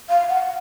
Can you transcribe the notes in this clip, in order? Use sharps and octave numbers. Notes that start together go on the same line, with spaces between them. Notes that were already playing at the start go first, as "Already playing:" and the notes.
F5
F#5